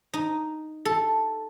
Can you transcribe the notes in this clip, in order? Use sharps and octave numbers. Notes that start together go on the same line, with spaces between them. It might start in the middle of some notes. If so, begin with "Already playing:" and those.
D#4
A4